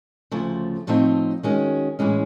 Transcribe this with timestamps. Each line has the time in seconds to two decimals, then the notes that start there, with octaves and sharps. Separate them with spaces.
0.31 D2 C#3 F3 A3
0.87 A2 F3 A3 C4 D#4
1.43 D#3 G#3 C#4 F#4
1.99 A2 E3 G#3 C#4